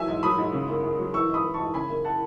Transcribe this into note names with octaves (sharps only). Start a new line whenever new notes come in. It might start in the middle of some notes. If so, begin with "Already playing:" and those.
Already playing: E3 F#3 E5 G#5
G#2
F#3 B5 D#6
G#2
C#3
F#2
F#2
F#3
E3 C#6 E6
G#2
B5 D#6
E3
A5 C#6
G#2
C#3 G#5 B5
F#2
F#5 A5